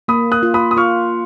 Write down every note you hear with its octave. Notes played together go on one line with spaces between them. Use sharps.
A#3 B5 D#6
D#6 F#6
F4
B5 D#6
D#6
F4 C#6 F6